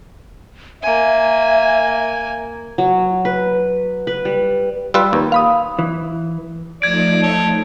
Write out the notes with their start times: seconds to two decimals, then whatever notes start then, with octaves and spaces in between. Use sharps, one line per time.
0.82 A#3 E5 G#5
2.78 F#3
3.25 B4
4.07 B4
4.25 G3
4.94 G3 F4 B4 E6
5.13 D#2
5.32 F5 B5 D#6
5.79 E3
6.82 F3 A3 D#4 D5 G#6 D7
7.22 A4 C#5